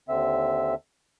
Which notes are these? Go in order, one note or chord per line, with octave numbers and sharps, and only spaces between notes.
D#2 D3 C4 E5